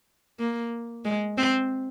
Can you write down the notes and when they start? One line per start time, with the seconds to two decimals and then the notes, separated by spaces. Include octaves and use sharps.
0.39 A#3
1.05 G#3
1.38 C4